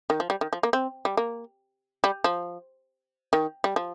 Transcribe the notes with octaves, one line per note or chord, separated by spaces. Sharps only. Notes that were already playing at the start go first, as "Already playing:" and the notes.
D#3
F3
G3
D#3
F3
A#3
C4
G3
A#3
G3
F3
D#3
G3
F3